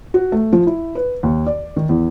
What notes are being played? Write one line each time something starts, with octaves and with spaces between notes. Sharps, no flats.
F#4
A3
F3
E4
B4
D#2
D5
D#3
E2